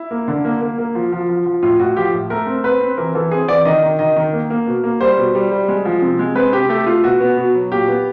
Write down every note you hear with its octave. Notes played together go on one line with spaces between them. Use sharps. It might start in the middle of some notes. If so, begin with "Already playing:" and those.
Already playing: E4
A#3
D3
A#3
A#3
A#3
F3
F3
F3
F3
A2 F4
A2 F#4
F3 G4
A2
A3 A#4
C4
C4 B4
C4
E3 A#4
E3 A4
C4 G#4
E3 D5
D#3 D#5
D#3
D#3 D#5
D#3
A#3
A#3
B2
A#3
G3 C5
B2
G3
G3
G#3
F3
C3
G#3
C4 B4
C3 G4
A3 G4
A3 F4
B2 F#4
B3
B2
F#3
A#2 G4
B3